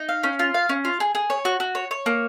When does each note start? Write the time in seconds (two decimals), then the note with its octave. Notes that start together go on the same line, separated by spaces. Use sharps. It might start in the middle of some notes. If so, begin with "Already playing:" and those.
Already playing: D#4
0.09 F5
0.23 C#4
0.39 F4
0.54 F5
0.69 C#4
0.85 F4
1.00 G#4
1.15 G#4
1.30 C#5
1.45 F#4
1.60 F#4
1.75 C#5
1.91 C#5
2.06 A#3